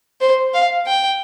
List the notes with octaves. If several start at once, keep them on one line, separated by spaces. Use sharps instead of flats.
C5
F5
G5